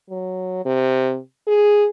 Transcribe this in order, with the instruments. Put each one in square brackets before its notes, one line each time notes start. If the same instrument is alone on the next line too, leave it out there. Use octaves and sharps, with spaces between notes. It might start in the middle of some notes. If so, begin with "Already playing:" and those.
[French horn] F#3
C3
G#4